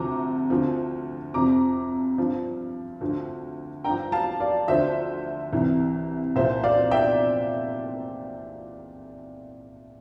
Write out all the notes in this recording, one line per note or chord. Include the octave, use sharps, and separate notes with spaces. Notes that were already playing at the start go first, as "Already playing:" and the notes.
Already playing: D2 C3 F3 A#5 D6
D2 D3 F3
F2 C3 F3 A#5 D6
G2 F3
D2 D3 F3
G2 F3 G5 A#5
F5 A5
D5 F5
D2 D3 F3 C5 E5
C2 C3 E3
C2 A#2 F3 C5 E5
D5 F5
E5 G5